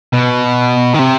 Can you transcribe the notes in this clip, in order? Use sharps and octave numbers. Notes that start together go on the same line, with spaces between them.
B2
D#3
C3